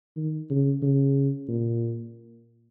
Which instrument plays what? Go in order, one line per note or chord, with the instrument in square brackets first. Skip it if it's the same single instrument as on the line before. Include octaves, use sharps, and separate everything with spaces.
[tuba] D#3
C#3
C#3
A#2